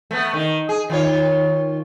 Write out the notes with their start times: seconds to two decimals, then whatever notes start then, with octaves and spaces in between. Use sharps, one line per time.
0.11 A3 B3
0.33 D#3
0.69 G#4
0.90 D#3 F4 C#5